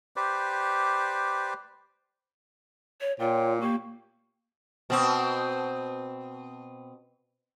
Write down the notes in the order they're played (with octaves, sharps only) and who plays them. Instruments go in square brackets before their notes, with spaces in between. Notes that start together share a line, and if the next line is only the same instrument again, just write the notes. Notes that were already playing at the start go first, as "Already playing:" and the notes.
[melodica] G4 B4 C5 D5
[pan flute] C#5
[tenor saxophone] A#2 [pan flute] F4 [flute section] C#5 G5
[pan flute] A#3 [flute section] G4 C#6
[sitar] B2 C4